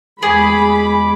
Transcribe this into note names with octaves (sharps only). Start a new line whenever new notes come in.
E2 G#3 G#4 B5 D6